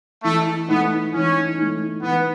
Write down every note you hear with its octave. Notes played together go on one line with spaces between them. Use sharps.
E3 A3
A3 B3 D#4
E3 C#4
A3 D#4
E3 B3